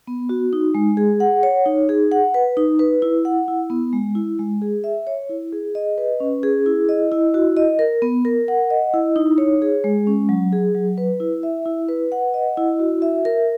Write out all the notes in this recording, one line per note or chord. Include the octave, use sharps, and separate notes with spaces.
B3
F#4
D#4
G#3
G#4
F#5
C#5
D#4
G#4
F#5
B4
D#4
B4
E4
F#5
E4
B3
G#3
E4
G#3
G#4
E5
C#5
E4
G#4
D#5
B4
C#4
G#4
E4
D#5
E4
F#4
D#5
A#4
B3
A#4
F#5
D#5
E4
D#4
C#5
G#4
G#3
C#4
F#3
G#4
F#3
B4
E4
E5
E4
B4
F#5
D#5
E4
F#4
E5
A#4